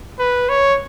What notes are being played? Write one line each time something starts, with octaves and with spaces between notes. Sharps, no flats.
B4
C#5